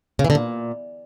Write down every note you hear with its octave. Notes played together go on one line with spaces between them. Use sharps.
C#3
E3
D3
A#2